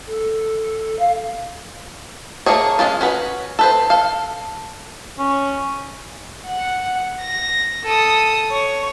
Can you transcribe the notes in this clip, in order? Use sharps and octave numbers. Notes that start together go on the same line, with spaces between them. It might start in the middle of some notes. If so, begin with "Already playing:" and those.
A4
F5
A3 A#3 G#4 C#5
G#3 C4 C#4 F4
C#4 F#4 B4
A4 B4 C5
A4 F5
C#4
F#5
A#6
A4 D#6
C#5